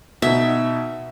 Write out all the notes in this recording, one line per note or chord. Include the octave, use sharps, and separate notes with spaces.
B2 D#4 E5